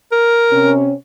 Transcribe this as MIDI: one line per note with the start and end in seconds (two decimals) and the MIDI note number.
0.12 0.72 70
0.51 0.92 48
0.51 0.92 61